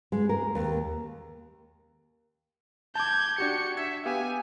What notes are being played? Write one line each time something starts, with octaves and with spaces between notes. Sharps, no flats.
G#3
A#4
D#2
A5 D6 G6 G#6
D4 F#4 G4 C#7
E5 G#6
B3 G4 F5 G#5